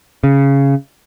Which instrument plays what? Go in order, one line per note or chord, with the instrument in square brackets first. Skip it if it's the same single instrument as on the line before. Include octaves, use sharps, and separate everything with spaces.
[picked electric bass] C#3